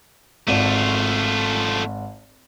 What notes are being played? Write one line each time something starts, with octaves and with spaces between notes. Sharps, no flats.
G#1 A3 F4 D5 D#7